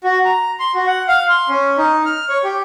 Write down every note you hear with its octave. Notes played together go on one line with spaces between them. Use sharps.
F#4
A#5
C6
F#4
F#5
F5
C6
C#4
D#4
F6
C#5
G4